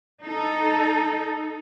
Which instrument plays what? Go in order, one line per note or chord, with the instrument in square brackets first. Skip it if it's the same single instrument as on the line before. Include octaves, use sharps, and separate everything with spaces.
[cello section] D#4 A4